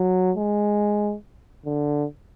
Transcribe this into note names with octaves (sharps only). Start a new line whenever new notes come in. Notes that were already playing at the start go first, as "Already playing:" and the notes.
Already playing: F#3
G#3
D3